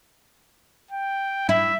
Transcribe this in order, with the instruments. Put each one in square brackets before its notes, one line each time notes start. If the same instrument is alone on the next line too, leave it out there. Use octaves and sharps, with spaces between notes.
[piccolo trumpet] G5
[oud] E4 [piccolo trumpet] E5